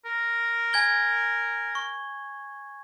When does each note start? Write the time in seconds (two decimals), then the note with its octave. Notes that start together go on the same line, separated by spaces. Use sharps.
0.05 A#4
0.73 G#5 G#6 G7
1.75 C#6